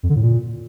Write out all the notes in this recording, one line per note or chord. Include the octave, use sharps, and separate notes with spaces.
F2
D3
A2
A#2